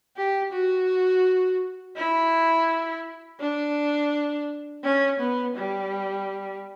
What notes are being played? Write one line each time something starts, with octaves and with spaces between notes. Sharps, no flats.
G4
F#4
E4
D4
C#4
B3
G3